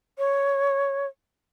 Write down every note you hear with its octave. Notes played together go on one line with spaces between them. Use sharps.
C#5